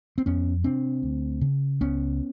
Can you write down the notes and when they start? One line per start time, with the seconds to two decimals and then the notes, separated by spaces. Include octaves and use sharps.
0.18 C4
0.26 F2 B3 C#4
0.64 C3 C4 D4
1.03 D2
1.41 C#3
1.81 C#2 B3 C#4